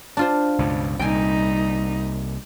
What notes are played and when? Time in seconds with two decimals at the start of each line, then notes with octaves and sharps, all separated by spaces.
0.17 D4 F4 C5
0.59 C#2 G2 B2
0.99 C2 A#2 G3 D#4 G5 G#5